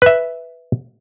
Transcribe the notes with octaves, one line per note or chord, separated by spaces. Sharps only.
B4 E5